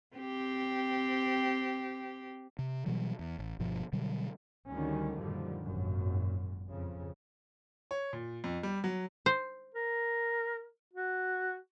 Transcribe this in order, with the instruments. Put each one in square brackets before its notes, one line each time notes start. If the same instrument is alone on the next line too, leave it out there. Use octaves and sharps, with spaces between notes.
[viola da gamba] C4 G4
[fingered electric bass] C3
B2 E3 F#3 G3
E2
A1
G1 G2 B2 F3
B2 D3 F#3 G3
[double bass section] D2 D3 D#3 G3 C#4
F#2 A#2 D3 D#3 F3 G3
G#1 F#2 A#2
F2 C#3
[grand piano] C#5
A#2
F2
G3
F#3
[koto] C5
[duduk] A#4
F#4